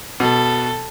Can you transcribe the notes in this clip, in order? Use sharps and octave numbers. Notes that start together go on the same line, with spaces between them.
B2 A4